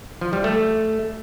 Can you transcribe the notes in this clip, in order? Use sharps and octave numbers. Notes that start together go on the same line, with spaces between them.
F3
G3
A3